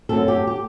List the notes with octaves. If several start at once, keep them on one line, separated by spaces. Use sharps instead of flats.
F#2 F#3 A3 C4 A4
G4
G4